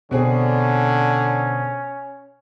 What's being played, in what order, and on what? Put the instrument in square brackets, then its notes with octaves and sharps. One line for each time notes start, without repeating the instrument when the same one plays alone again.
[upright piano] B2 C4 G#4 [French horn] D3 [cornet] C#4